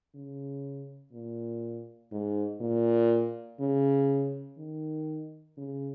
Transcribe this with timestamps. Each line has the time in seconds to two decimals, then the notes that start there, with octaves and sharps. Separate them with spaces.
0.15 C#3
1.13 A#2
2.11 G#2
2.61 A#2
3.60 C#3
4.58 D#3
5.57 C#3